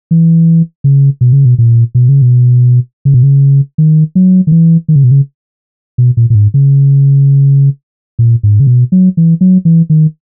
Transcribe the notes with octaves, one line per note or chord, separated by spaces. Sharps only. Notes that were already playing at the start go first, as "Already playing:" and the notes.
E3
C#3
B2
C#3
B2
A#2
B2
C#3
B2
C#3
B2
C#3
D#3
F#3
D#3
E3
D#3
C#3
B2
C#3
B2
A#2
A#2
G#2
C#3
A#2
G#2
C#3
B2
F#3
E3
F#3
E3
D#3